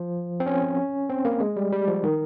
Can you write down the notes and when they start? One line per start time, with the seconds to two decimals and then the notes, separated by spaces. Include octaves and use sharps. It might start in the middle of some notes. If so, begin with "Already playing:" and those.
Already playing: F3
0.40 C4
0.46 C#4
1.10 C4
1.25 A#3
1.40 G#3
1.56 G3
1.72 G3
1.88 F3
2.04 D#3